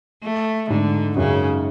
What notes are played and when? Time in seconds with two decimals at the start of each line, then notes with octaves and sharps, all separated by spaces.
0.23 A3
0.70 G#2 D3
1.16 F#2 C#3